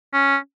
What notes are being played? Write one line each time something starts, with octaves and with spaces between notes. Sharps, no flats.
C#4